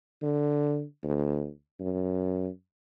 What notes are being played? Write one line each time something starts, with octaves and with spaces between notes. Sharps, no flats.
D3
D2
F#2